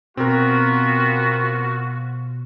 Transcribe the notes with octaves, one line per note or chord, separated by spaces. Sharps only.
B2 B3 C4 F4 F#4 A#4